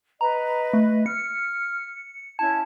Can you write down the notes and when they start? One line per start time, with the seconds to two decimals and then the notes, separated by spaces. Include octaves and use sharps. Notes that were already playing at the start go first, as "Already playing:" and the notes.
0.21 B4 D#5 A#5
0.73 A3
1.06 F6 C#7
2.39 C#4 E4 A5 G#6